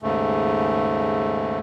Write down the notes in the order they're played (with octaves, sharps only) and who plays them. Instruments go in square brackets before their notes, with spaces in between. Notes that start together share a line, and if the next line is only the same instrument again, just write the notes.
[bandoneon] D#2 G#2 C#3 A3